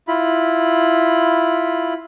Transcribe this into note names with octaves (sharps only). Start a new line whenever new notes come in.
E4 F4 B5